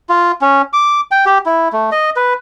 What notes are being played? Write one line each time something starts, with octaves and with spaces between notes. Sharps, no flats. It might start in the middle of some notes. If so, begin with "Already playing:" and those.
F4
C#4
D6
G5
G4
E4
A3
D#5
B4